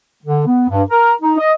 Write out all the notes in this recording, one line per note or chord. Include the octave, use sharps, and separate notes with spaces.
D3
B3
G2
A#4
D#4
D#5